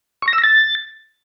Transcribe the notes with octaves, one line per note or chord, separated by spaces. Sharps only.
C#6
A#6
E6
A#6
A6